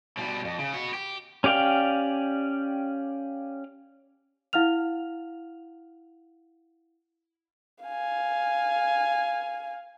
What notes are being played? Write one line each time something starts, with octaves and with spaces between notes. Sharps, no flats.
B2 G3
F2
C#3
B3 F#4
G4
C#4 G4 D5 F5 G5
E4 F5 F#5 F6 F7
F5 G#5